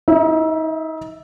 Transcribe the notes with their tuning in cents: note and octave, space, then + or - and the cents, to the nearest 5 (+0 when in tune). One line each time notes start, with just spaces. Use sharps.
D#4 +35 E5 +0